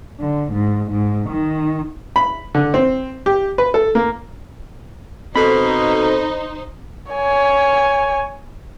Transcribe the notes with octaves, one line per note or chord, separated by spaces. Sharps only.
D3
G#2
G#2
D#3
B5
D3
C4
G4
B4
A4
A#3
B2 C4 D#4 A4 C5 B5
C#5 G#5